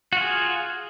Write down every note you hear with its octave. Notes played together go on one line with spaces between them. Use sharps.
F4 F#4 G#4